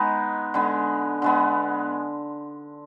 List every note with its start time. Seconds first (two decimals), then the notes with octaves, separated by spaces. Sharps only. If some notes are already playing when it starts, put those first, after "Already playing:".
Already playing: G#3 B3 D#4
0.54 D3 G#3 B3
1.22 D3 G#3 B3